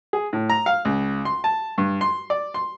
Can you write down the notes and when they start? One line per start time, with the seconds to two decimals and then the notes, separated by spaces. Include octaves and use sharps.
0.13 G#4
0.33 A2
0.50 A#5
0.66 F5
0.85 C#2
1.25 C6
1.44 A5
1.78 G2
2.01 C6
2.30 D5
2.54 C6